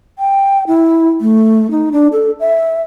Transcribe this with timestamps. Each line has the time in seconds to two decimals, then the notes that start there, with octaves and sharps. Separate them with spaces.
0.19 G5
0.67 E4
1.21 A3
1.71 D#4
1.92 D4
2.13 A4
2.40 E5